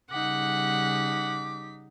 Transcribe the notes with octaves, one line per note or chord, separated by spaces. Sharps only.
C#3 G3 D#4 F#5 D6 B6